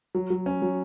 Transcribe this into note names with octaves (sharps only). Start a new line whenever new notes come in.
F#3
F#3
C#4
F#3